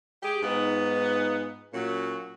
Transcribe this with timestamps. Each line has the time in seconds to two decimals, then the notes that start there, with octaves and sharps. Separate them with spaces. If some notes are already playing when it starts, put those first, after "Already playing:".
0.23 G4 G#4
0.42 G#2 B3 D#4 F4
1.74 A#2 F#3 C#4 F#4